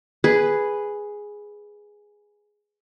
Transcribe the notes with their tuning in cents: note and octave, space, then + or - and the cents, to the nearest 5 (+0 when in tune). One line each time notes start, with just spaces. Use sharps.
G#4 +0 B4 +0